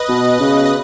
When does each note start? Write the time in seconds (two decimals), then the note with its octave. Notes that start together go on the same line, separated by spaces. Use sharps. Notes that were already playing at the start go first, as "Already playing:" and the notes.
Already playing: B4 D#5
0.09 B2
0.40 C#3
0.65 D#5